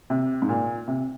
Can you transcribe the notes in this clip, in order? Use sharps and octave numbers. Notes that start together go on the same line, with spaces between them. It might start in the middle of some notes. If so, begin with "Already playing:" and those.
C3
G#2
A#2
C3